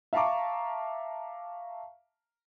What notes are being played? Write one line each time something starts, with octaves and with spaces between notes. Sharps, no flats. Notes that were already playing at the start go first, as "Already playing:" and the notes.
E5 F5 A5 A#5 C#6 D6